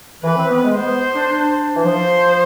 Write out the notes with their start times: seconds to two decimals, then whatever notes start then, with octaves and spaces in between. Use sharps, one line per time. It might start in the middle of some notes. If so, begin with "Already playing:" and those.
0.23 E3 B4
0.37 C4
0.50 B3
0.64 G#3
0.77 B3 C5
1.13 D4
1.31 D4
1.75 E3
1.84 F3 C5